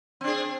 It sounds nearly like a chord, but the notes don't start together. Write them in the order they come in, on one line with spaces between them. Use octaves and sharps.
C4 D4 G#4